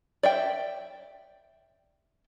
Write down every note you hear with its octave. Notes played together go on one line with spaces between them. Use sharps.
D5 E5 G5